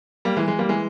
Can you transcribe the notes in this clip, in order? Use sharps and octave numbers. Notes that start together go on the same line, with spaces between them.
G3 A#3
E3 G#3
E3 G#3
G3 A#3
E3 G#3